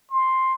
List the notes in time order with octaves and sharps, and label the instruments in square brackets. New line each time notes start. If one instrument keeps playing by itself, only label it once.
[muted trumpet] C6